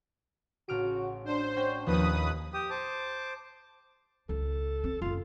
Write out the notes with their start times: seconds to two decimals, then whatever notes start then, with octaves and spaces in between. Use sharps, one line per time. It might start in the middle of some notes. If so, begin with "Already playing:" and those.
0.69 A1 C#3 F#4 F6 D7
1.26 D4 C5
1.56 C#4 F#4 G5
1.86 D#2 F3 D#4 B4 D#6
2.53 G4 D#6
2.70 C5 A5 D6
4.29 C#2 A4
4.84 C4
5.02 F#1 C#3 F4